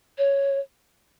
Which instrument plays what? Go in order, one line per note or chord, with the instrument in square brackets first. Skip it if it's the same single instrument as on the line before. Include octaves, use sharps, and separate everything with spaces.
[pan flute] C#5